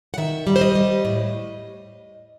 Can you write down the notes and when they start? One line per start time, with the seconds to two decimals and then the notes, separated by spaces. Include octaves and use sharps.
0.14 F#5
0.18 D#3 E5
0.47 G3
0.56 C5
0.61 D#5
0.75 G3
1.05 A2